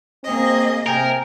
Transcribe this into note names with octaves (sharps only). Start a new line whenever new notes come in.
A#3 C4 G#4 D#5
C3 A#4 G5 G#5 A#5